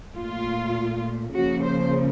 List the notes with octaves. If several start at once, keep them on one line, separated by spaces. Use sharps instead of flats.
A#2 A3 F4
C#3 F3 A#3 F#4
C5